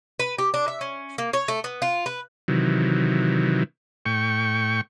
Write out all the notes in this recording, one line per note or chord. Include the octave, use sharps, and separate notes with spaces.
B4
G4
D4
E5
C#4
A#3
C#5
A3
B3
F4
B4
C3 D#3 E3 F#3
A2 G5 C#6